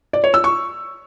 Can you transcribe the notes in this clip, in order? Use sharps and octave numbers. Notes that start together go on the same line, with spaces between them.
D5
C#5
E6
C#6